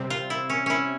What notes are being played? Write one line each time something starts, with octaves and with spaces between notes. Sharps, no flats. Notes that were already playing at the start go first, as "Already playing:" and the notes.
Already playing: C3 G3 C4
F4
E4
C#4
C#4 E4